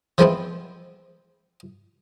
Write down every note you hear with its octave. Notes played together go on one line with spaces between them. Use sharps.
E3 F3 G#3 B3 C4 E4